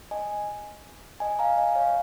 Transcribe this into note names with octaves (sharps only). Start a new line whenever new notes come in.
D#5 G#5
D#5 G#5
F5 A#5
D#5 G#5
C#5 F5